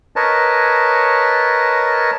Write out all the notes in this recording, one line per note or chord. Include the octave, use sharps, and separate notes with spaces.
A#4 B4 C#5 D#5 A5